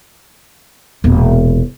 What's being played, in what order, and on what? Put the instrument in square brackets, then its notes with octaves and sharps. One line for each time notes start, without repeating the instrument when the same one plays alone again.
[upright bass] E1 A#2